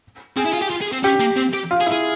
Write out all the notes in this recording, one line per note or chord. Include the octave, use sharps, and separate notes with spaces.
C4 G#4
E4
F4
G4
F4
G#4
C4
C#4 G4
A#3
C4
G4
F4
G#4
E4
G#4